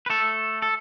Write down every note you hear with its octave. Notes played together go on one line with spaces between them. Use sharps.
B4
A3 A4
A4